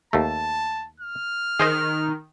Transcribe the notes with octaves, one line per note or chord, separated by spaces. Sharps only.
D#2 A3 A5
F6
D#3 G#4 C5 D#5